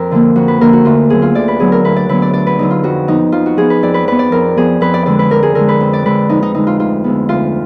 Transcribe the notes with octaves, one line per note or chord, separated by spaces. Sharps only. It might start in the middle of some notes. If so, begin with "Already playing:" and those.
Already playing: F2 F4 A#4
D3 F3 A#3
F2 F#4
B4
D3 F3 A#3 A#4
F#4
D2 F4
D3 F#3 B3 G#4
F4
D2 D5
B4
D3 F#3 B3 G#4
A#4
D2 B4
D5
D3 F#3 B3 B4
D5
D2 D5
B4
D3 F#3 B3 D#4
F4
F2 F#4
F3 B3 D#4
F2 F4
F#4
F3 B3 G#4
B4
F2 D5
B4
F3 B3 B4
D5
F2 A#4
F3 B3 G#4
F2 B4
D5
D3 G#3 D5
B4
F2 A#4
G#4
D3 G#3 A#4
B4
F2
D5
D3 G#3 B4
F2 D#4
D#4
D3 G#3 D#4
F4
D2 F4
D3 G#3 B3
D2 F4